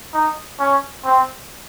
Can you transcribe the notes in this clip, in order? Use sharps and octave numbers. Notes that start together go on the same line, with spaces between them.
D#4
C#4
C4